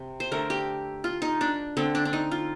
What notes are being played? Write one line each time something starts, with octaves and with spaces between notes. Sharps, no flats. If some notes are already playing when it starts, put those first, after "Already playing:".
Already playing: C3
C5
D3 A3 A#4
G4
F4
D#4
D4
D3 A3 C4
D4
D4
D#4
F4